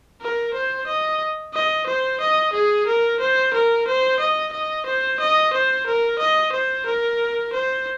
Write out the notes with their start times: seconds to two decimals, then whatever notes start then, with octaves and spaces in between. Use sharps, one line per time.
0.21 A#4
0.54 C5
0.87 D#5
1.54 D#5
1.87 C5
2.21 D#5
2.53 G#4
2.87 A#4
3.20 C5
3.54 A#4
3.87 C5
4.20 D#5
4.53 D#5
4.86 C5
5.20 D#5
5.53 C5
5.87 A#4
6.19 D#5
6.52 C5
6.86 A#4
7.53 C5